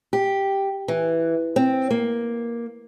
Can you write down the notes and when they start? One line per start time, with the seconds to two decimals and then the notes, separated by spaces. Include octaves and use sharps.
0.13 G4
0.88 E3
1.56 C4
1.91 A#3